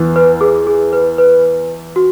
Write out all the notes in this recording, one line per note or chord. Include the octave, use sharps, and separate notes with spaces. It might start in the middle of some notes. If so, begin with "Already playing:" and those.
Already playing: E2 E3 B3
B4
G#4
G#4
B4
B4
F#4